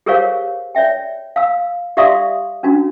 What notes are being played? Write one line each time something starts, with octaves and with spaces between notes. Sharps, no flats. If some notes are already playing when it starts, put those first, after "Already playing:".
G4 G#4 A#4 C5 C#5 F5
C#5 D5 E5 G5
F5 E6
G4 D5 E5 F5 C6 D#6
C#4 D4 F#4